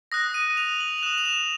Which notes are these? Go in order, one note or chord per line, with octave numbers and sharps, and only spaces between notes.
D#6 F#6 A#6
D#7
F7
F#7
F7
D#6 F#6 E7
F7
E7